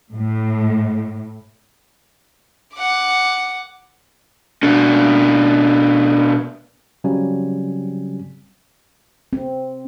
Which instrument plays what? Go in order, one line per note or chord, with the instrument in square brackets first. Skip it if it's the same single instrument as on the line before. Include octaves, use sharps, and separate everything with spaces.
[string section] A2
[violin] F#5 D6
[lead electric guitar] B2 D4
[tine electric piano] C#3 F#3 G3 C4 G#5
[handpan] C4